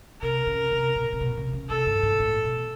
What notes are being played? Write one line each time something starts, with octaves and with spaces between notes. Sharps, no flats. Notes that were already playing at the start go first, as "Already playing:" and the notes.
C3 A#4
C#3
C3
B2
C3
B2
C3
C#3
C3 A4
G2
G#2
A2
B2